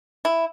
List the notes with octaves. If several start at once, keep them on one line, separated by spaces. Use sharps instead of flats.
E4